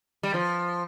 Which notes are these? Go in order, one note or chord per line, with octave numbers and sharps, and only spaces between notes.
G3
F3